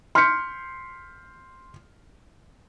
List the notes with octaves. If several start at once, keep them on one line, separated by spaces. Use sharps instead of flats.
C6 F6 G6 B6 C#7